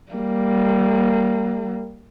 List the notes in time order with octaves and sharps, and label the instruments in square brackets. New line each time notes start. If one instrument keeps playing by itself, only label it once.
[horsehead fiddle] G3 A#3